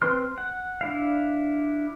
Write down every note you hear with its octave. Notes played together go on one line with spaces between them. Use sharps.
C4 B4 C6 F6
F#5
D4 E4 F5